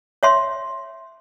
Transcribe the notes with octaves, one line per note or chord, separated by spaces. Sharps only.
C#5 E5 C6